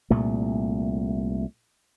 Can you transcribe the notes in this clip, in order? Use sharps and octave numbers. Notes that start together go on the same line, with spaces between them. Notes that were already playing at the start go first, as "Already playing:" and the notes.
C2 A#2 A3